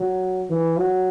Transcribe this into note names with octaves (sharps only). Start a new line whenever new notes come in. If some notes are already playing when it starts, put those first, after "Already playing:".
Already playing: F#3
E3
F#3